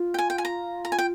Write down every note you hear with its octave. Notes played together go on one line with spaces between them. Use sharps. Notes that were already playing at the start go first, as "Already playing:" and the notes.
Already playing: F4
G5
G#5
G5
G#5
A#5
A#5
G#5
G5